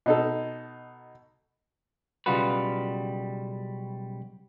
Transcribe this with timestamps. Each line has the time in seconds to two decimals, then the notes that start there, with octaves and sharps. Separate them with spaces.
0.06 B2 D#4 A4
2.26 B1 C#3 G3 F4 F#4 B4